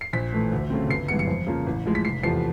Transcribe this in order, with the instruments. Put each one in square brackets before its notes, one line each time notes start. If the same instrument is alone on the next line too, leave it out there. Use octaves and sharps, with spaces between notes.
[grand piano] C7
A#1 B6
A2 E3 A3
D2
C#3 F#3 A3 C4
G1 C7
G2 E3 G#3 B3 C#7
C#7
F2
C#3 F3 A#3
A1
A2 F3 G#3
B6
F1 C7
E2 C3 F3 A3 C7